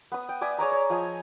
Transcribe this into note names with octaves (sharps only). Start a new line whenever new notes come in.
B3 D#6
G5
D5 E5 G#5 D#6
G#4 C#5 D5 A#5
C#5
F3 D#5 G#5